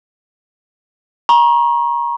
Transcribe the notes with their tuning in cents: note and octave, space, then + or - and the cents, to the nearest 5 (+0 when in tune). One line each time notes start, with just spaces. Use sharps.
A#5 +30 C#6 -25